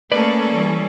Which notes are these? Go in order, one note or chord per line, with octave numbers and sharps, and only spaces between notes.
A3 A#3 C#4 G#4 A4 B4 D5
E3 G3